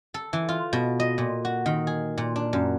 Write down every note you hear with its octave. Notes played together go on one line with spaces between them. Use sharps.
A4
E3
F4
B2
D#5
A#2
F#4
D#3
G#4
A#2
D4
F#2